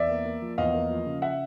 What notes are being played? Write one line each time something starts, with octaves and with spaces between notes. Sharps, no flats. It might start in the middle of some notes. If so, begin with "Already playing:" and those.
Already playing: E2 D5 E5
A#3
A#3
F3
E2 D#5 F5
A#3
F3
C#3
E5 F#5